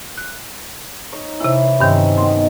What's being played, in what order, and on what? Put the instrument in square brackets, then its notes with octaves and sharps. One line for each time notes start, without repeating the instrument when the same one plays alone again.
[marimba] F#6
[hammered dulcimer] D#4 C#5 D#5
[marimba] C3 E4 [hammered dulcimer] E3
[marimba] G2 D#3 [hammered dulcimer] C4 C#4 D#4
[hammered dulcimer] B2 D#3 [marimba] C6